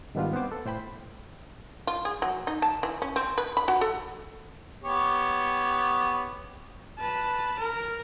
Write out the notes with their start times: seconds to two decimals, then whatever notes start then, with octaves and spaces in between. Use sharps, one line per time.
0.15 G#2 D#3 G3 B3 D4 F4
0.33 B3 C4 C5 D6
0.52 A4
0.66 A2 C5 G5 B5
1.87 F4
2.05 G#4
2.22 F#3
2.47 D#4
2.62 A5
2.83 E3
3.02 C#4
3.16 C4
3.38 B4
3.57 B5
3.68 F#4
3.81 A4
4.84 B3 G4 C#5
6.98 B4 A5
7.59 A#4